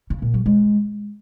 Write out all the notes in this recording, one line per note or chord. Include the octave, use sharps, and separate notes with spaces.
C#3
A#2
F#3
G#3